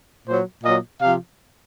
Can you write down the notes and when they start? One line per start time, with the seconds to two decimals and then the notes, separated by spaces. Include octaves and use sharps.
0.27 A#2 F#3 C5
0.64 A#2 F#3 D#5
1.01 C3 F3 F5